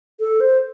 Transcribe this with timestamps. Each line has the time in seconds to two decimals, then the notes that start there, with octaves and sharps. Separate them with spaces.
0.20 A4
0.40 C5